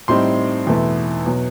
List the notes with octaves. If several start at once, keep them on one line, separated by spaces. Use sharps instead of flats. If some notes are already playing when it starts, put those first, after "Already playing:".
A2 G3 C4 D#4 C6
E2 B2 A3 E4
B2 F#3